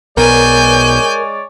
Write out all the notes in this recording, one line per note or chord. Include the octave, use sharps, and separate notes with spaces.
B1 B2 G#3 A#4 C#5 D5 G#5 G6